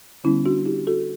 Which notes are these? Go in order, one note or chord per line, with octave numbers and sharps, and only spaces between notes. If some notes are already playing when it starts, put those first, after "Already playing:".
D3 G3 B3 C#4 E4
D4 F#4
E4 G4
F#4 A4